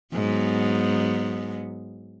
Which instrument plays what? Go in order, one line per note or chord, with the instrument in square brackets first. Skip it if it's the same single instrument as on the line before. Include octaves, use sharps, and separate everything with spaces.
[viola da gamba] G#2 F#3 B3